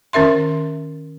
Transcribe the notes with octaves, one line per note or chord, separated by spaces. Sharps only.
D#3 C#4 A#4 E5 C6